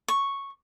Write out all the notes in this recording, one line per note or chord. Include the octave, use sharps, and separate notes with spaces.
C#6